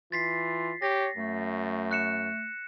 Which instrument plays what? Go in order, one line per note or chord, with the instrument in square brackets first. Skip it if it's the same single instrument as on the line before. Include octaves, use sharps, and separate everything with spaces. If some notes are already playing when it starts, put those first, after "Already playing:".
[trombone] E3 [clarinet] F4 [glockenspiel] A6 B6 C7
[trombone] G4 [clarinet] C#5 [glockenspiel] A#6
[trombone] F#2 [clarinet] A3
[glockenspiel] F#6 C#7 E7